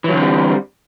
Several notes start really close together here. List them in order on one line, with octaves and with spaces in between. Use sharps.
E3 F#3 D3 C4 G3